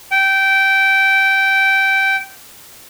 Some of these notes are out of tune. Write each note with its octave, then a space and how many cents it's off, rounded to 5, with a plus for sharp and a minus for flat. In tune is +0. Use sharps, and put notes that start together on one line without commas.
G5 -15